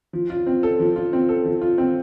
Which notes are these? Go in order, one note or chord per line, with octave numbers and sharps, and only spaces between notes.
F3
F4
C4
A4
F3
F4
C4
A4
F3
F4
C4